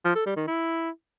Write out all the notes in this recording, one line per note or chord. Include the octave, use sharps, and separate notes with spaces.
F3
A4
G3
D#3
E4